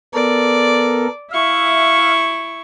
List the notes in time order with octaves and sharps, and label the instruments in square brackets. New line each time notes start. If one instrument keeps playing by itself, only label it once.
[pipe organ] B3 A4 A#4 [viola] D5
[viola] E4 C#6 [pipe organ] E5 F5